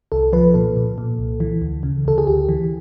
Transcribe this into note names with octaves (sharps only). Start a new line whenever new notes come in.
C2 A4
F3 B4
A#2 A4
A#2
A#2
C2
E3
D2
C#3
D2 A4
G#4
D2 G4
E3